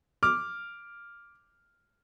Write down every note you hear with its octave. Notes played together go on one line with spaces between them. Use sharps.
D6 F6